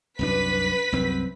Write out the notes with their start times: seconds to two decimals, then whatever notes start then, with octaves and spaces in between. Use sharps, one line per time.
0.19 C2 F#2 D4 B4 B6
0.92 C2 F#2 C4